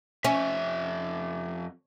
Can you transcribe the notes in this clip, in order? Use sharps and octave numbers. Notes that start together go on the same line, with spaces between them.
F2 C#4 E5